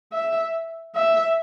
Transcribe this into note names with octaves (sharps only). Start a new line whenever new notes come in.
E5
E5